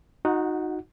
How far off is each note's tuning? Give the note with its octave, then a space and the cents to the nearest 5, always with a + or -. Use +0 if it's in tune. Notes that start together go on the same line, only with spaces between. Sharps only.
D#4 +0 F#4 -25 F#5 +0